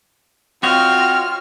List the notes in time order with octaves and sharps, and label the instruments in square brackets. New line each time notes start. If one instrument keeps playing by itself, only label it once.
[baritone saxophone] C4 [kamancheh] F4 F6 [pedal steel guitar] F#4 C#5 D#5